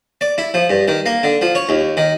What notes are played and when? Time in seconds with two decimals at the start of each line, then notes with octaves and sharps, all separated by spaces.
0.21 D5
0.38 E4
0.54 F3
0.70 G2
0.88 D#3
1.06 A#3
1.23 D3
1.41 F3
1.55 C#5
1.69 D#2
1.97 D#3